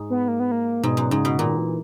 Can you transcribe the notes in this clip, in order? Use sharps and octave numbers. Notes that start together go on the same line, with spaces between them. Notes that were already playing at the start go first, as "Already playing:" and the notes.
Already playing: G#2
B3
A#3
B3
A#3
G#2 B2
F#2
G#2 C#3
B2
A#2 D#3
E3